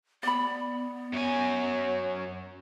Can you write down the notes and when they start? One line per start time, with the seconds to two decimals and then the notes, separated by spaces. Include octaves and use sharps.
0.23 B3 D5 B5
1.13 F#2 C#5 G#5